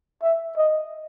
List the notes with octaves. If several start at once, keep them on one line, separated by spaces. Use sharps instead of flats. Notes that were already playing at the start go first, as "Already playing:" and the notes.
E5
D#5